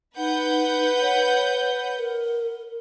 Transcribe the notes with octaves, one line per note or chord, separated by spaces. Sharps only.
D#4 B4 F#5 G6
C#5
A#4